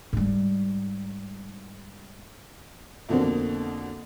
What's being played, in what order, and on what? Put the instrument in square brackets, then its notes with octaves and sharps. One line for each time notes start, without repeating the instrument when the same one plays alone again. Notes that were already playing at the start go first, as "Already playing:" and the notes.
[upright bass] G#2 G3
[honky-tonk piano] F2 B2 D3 A#3 C4